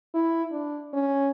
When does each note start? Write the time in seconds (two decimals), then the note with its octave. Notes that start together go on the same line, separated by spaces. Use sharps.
0.14 E4
0.51 D4
0.93 C#4